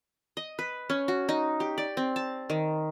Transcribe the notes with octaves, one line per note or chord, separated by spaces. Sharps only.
D#5
B4
C#4
F#4
D#4
G4
D5
C4
A5
D#3